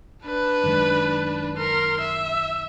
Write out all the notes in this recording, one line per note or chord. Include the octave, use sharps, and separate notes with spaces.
D4 B4
F#2 D#3 G#3
A#4 C6
E5